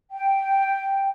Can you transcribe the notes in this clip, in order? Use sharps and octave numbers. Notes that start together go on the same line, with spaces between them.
G5